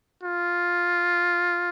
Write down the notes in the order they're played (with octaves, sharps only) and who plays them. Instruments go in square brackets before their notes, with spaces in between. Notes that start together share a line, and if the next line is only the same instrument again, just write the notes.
[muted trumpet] F4